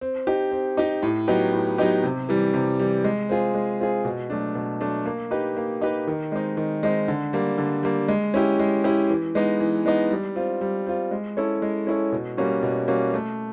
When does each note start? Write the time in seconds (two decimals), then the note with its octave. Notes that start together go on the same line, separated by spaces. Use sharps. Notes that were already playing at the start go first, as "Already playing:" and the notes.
0.01 C4
0.27 D#4 G4
0.52 C4
0.77 D#4 G4
1.03 A2
1.28 F#3 B3 D#4 G4
1.53 A2
1.78 F#3 B3 D#4 G4
2.04 C3
2.29 E3 G3
2.54 C3
2.79 E3 G3
3.04 G#3
3.29 C4 F4 G#4
3.55 G#3
3.80 C4 F4 G#4
4.05 B2
4.30 F#3 A3 D4
4.55 B2
4.81 F#3 A3 D4
5.05 A#3
5.31 D#4 G4 B4
5.57 A#3
5.81 D#4 G4 B4
6.07 D#3
6.32 G#3 C4 D#4
6.57 D#3
6.83 G#3 C4 D#4
7.08 D3
7.33 G3 A#3
7.58 D3
7.83 G3 A#3
8.08 G#3
8.34 C#4 E4 G4
8.59 G#3
8.84 C#4 E4 G4
9.10 E3
9.35 G#3 B3 D#4
9.60 E3
9.86 G#3 B3 D#4
10.11 G3
10.36 C4 F4
10.61 G3
10.86 C4 F4
11.11 G#3
11.37 C#4 E4 A4 C#5
11.62 G#3
11.87 C#4 E4 A4 C#5
12.12 B2
12.37 G3 A#3 C#4 F#4
12.63 B2
12.88 G3 A#3 C#4 F#4
13.14 A3